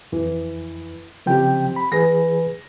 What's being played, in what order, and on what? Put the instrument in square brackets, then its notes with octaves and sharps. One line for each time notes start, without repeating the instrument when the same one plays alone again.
[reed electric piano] F2 [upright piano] E3
[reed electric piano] C#3 F3 G5 [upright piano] C4 G4
[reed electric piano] B5
[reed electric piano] E3 G#4 B4 [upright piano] A#6